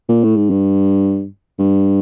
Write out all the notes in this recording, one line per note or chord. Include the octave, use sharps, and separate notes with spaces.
A#2
A2
G#2
G2
G2